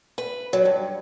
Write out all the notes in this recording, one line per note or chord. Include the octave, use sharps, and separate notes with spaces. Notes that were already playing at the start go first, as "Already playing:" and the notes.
B4
F#3
G2